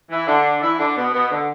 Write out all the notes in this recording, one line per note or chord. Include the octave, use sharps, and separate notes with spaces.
E3 E4
D3 D4
E3 E4
D3 D4
B2 B3
B2 B3
D3